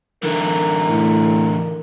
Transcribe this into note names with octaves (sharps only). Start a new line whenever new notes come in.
D3 E3 A#4
A2